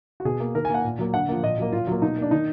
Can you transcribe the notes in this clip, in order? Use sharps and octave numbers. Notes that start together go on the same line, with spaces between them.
F#4
B2 G#4
A#3
D#3 A#4
G#5
A#3 F#5
A#2
F#3 A#3
D3 F#5
F3 A#3
A#2 D#5
F#3 A#3
A#2 F4
F#3 A#3
B2 D#4
A#3
D4
D#3 D#4